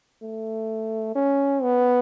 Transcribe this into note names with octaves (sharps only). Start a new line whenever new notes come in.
A3
C#4
B3